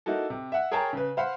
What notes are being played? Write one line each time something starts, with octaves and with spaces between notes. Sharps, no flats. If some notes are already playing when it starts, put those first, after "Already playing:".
A#3 D#4 E4 F#4 A4
C3
E5 F#5
G#4 A#4 C#5 G5 A5 A#5
C#3 B4
C5 F5 F#5 B5